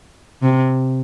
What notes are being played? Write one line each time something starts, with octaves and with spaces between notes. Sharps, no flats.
C3